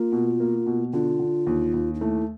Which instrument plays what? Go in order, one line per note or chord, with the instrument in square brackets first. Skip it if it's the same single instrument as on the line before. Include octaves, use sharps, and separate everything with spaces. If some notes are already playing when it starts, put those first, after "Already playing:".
Already playing: [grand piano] A#3 [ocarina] F4
[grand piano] B2
A#3
B2
[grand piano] D3 [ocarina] F4
[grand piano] D3
D#2
D#2
[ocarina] D#4
[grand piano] A3 [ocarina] E4